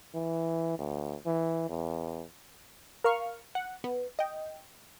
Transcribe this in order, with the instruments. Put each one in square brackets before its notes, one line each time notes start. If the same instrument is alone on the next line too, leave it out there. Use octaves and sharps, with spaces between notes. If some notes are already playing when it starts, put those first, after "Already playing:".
[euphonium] E3
D2
E3
E2
[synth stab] A#4 F5 C#6 F6
F#5
B3
D#5 G5